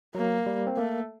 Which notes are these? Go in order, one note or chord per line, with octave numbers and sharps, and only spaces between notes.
F#3 A#3
G3
C4
A3 A#3